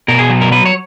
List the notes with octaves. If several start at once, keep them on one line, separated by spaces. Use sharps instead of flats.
B2 A#4
G#4
F#3
A#4
F#3 B4
C#5